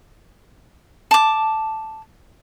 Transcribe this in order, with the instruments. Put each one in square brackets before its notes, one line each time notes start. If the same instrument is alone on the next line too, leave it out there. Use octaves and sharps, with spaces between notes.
[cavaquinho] A5 D6